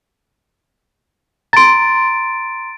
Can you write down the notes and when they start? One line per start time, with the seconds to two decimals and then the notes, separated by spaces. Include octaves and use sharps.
1.53 A#5 C6 A6 D7